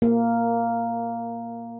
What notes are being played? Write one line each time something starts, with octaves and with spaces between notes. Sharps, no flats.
A#3